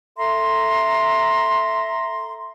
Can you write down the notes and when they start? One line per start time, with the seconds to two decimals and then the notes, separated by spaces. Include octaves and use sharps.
0.18 A4 E5 A#5 C6